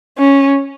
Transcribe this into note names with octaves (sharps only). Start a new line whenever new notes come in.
C#4